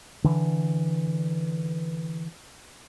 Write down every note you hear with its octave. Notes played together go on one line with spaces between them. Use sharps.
D3 E3